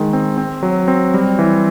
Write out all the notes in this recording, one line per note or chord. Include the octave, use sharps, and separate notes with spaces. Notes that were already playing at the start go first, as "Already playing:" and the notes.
Already playing: D#3 G#3
C4
C4
F#3
C4
G3
E3